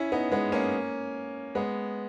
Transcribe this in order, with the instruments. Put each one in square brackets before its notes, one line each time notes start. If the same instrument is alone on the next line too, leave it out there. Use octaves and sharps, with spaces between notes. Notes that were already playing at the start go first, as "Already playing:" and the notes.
Already playing: [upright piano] C#4 E4
B3 D#4
G#3 B3
A#3 C#4
G#3 B3